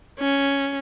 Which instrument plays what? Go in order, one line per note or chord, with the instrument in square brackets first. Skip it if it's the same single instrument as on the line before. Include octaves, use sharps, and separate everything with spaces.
[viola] C#4